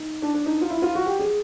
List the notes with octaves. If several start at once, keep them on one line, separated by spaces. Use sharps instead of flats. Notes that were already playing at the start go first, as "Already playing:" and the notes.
Already playing: D#4
D4
D4
D#4
F4
E4
F4
F#4
G4
G#4